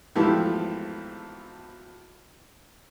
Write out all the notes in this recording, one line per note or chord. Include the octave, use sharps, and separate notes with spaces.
G#1 E2 F3 A3 E4 G4